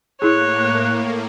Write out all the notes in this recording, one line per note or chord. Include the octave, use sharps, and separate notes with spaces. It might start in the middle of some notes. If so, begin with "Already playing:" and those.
A2 A#3 E4 G#4 C#5 F#6